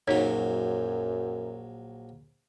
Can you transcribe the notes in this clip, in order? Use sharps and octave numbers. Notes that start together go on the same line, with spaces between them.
A#1 F#2 F#3 D#4 C#5